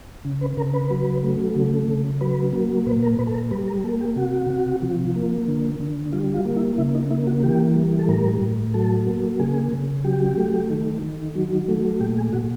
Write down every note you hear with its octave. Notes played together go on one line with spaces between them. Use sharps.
C#3
B4
C#3 A#4
B4
F#3
A3
C#3
C#3
F#3 B4
A#3
A#2 B4
A#4
A#2 B4
A4
A#4
G3 B4
A#4
A#3 A4
G4
C3 F#4
C3
F3
A#3
D3
D3
G3 F4
F4
A#3
E4
C#3 E4
D#4
A#3 E4
F#4
E3 G4
G3
A4
A2 A#4
A2
F#3 A4
A#3
C#3 G#4
C#3
F#3 G4
A3
D#3
D#3
F#3
A3
A#2 G4
G#4
A#2 F#4